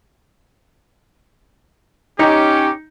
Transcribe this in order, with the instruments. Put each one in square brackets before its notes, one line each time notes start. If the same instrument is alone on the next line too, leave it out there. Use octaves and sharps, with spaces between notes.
[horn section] C#4 G4 [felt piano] D#4